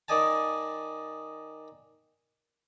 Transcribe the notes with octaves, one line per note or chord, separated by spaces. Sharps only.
D#3 D5 D#5 G#5 A5